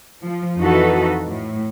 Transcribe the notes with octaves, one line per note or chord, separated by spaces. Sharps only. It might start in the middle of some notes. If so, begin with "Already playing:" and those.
F3
F2 E3 D#4 F#4 A4 B4
A2